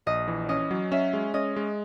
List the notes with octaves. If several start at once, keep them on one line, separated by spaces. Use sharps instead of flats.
A#1 D#5
E3
C#4 D#5
F#3
C#4 E5
G#3
C#4 D#5
G#3